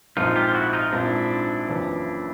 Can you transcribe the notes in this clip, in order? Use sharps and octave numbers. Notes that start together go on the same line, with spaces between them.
A#1 G#2 F3 G#3 C4 D#4 F4
F4 G4
F4
E4 F#4
D#4 F4
A#1 G#2 F3 G#3 C4 D4 E4
F#1 E2 C#3 F3